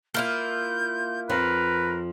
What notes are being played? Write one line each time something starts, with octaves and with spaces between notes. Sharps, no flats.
A#3 E4 F4 G6
F2 F3 A#4 B4